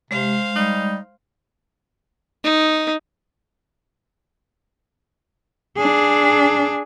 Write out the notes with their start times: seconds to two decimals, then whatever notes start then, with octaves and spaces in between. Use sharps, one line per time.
0.11 C3 G#3 C5 F5
0.56 G3 D#4
2.44 D#4
5.77 D4 G#4